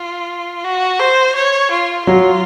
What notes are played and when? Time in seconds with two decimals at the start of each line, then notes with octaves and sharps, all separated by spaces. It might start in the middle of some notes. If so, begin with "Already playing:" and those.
Already playing: F4
0.64 F#4
1.00 C5
1.35 C#5
1.71 F4
2.07 F#3 F4